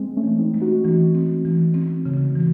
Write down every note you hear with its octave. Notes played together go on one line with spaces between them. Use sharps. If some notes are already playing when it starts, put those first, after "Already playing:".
Already playing: G#3 C4
A3 C#4
E3
C4 D#4
G#3
D#4 F#4
E3 D#4 F#4
C4
E3
C4
C#3
E3